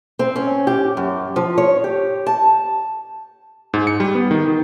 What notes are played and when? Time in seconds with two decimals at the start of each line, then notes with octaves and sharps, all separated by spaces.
0.19 C4
0.36 C#4
0.67 G4
0.97 F#2
1.36 F3
1.58 C#5
1.84 G4
2.27 A5
3.74 G#2
3.87 C#7
4.00 G3
4.15 B3
4.31 D#3
4.48 D#3